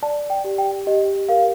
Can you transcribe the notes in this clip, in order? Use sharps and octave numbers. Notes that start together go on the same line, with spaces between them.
D5 A5
G5
G4
G5
G4 D#5
A#4 F5